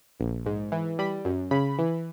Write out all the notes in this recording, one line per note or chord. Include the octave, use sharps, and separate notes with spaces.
A#1
G#2
E3
G3 B5
F#2
C#3 B5
E3